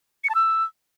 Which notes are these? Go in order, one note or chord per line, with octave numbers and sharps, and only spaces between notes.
C#7
A5
E6